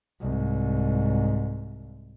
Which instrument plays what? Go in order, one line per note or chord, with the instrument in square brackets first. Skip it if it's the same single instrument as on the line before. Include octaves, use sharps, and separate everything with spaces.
[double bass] C2 G#2